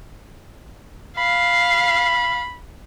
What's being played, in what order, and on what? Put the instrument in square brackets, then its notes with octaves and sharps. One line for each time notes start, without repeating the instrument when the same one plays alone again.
[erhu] F5 [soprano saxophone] B5